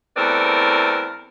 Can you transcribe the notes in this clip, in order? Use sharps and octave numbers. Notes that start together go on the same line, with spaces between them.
E2 A3 C4 A#4 B4 D5